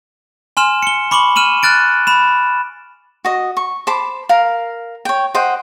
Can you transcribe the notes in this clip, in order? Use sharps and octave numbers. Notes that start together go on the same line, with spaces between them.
G#5 C6 F6 E7
C#7 G7
B5 C#6 D6 F#7 G7
F6 D#7 E7 F#7
F6 F#6 A6 D7
B5 E7
F#4 D#5
C#6
C5 A5 B5 D6
A#4 F5
C#5 G5
C5 D#5 F#5 G5